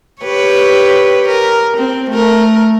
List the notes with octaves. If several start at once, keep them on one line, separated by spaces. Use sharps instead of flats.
G4 B4 C#5
A#4
C4
A3 A#4